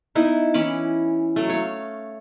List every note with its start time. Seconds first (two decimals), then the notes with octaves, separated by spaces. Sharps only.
0.15 B3 D#4 E4
0.54 E3 C#4 B5 D6
1.36 F#3 A3
1.49 C#5 F5